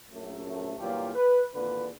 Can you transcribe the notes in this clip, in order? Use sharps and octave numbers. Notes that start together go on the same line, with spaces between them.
A#1 F#2 A3
E2 G2 A#2 F#3 F4 G4
B4
G#1 E2 A#2 D3 B4